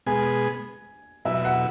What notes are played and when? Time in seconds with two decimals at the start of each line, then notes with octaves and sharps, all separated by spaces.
0.06 B2 G#3 B3 G#4 G#5
1.25 B2 F#3 E4 E5
1.45 F#5